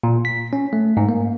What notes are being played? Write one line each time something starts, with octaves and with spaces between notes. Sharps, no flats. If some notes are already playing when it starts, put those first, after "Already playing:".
A#2
B6
C#4
A3
G#2
A#3